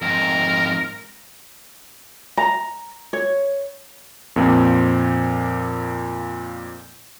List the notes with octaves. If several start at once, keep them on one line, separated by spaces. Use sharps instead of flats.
F2 G#2 A#4
A#5
C#5
F2 A#2 C4